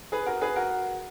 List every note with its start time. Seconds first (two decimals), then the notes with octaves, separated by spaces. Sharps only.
0.12 G#4 B4
0.26 F#4 A#4
0.41 G#4 B4
0.56 F#4 A#4